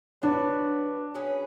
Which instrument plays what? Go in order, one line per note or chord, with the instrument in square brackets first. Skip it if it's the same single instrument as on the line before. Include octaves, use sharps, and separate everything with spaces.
[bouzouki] F#3 B3 F#4 B4 [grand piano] D4
[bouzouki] F#3 C#4 G#4 B4